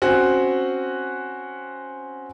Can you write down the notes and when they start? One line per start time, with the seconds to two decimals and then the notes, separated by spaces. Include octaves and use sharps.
0.02 C4 C#4 F#4